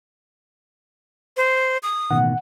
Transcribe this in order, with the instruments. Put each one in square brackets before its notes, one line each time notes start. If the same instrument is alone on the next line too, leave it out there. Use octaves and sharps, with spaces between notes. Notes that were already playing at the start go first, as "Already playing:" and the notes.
[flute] C5
D#6
[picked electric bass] A1 B2 D#3 [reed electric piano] F#5